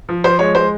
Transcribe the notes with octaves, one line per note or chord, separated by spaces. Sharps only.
F3
F3 C5
G#3 C#5
G#3 C5